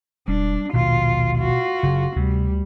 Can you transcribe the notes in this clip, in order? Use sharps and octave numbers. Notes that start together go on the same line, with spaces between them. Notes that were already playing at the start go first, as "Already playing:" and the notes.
E1 G3 D4
A#1 D#2 B2 F4
F4 F#4
F#1 C#3
D2 C3 G3